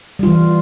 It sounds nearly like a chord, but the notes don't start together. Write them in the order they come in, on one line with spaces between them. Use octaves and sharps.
G3 F4 E3